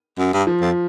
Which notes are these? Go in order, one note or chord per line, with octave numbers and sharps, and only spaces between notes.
F#2
G2
F3
F2